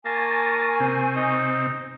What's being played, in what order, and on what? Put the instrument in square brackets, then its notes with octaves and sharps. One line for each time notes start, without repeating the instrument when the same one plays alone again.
[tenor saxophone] A#3 [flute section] G#5 C#6 [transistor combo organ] A5
[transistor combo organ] C3 C4
[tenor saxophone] D#4